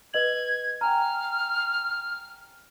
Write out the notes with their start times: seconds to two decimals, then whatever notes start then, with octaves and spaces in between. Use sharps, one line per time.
0.14 B4 D#5 G#6 F#7
0.81 G5 G#5 A#5 F6